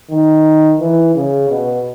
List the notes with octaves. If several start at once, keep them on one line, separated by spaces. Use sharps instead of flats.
D#3
E3
C#3
B2